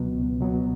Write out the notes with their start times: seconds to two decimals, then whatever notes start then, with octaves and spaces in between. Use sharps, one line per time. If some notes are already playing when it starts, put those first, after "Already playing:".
Already playing: C#2 B2 F#3 B3
0.15 C#2
0.40 B2 F#3 B3